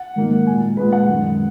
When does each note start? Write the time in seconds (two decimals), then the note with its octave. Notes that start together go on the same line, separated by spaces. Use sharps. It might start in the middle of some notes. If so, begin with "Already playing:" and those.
Already playing: F#5
0.16 G#2 D#3 F#3 A#3
0.46 A#2 G#3 G#5
0.77 A#2 G#3 B4
0.92 F#5
1.08 F#2 D#3 G#3